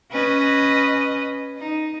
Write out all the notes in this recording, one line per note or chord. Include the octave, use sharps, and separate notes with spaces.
C#4 B4 D#5
D#4